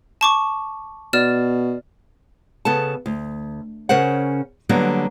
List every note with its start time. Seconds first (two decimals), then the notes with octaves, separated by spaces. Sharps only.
0.21 A5 C#6 D6
1.13 B2 D5 F6 E7
2.65 C#3 B3 A4 A5
3.06 D2
3.89 C#3 C#4 A#4 C5 F#5
4.69 D3 F#3 G3 A#3 B3